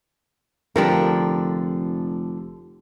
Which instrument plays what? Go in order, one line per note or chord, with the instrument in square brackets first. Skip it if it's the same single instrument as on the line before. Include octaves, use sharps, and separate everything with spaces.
[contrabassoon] F1 [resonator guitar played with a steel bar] D3 F3 G4 [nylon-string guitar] D4 A#4